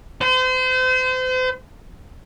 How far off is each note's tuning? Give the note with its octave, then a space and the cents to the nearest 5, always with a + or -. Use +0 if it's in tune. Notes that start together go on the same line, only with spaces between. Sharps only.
C5 -35